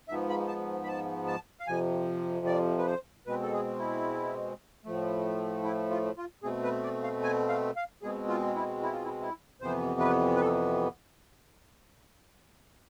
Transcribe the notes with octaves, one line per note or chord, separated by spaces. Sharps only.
G#2 F3 B3 E5
B5
A5
B5
A5
A5
F5
F2 C3 F3 G#5
D5
B4
C5
B2 G#3 C4 B4
A4
G#4
E4
A2 F3 A3
E4
F4
F4
B2 A3 C4 G#4
B4
D5
F5
G#5
F5
F5
B2 G#3 C4 G#4
F4
E4
E4
F4
E4
E4
F2 C3 E3 B3 C5
B4
B4
A4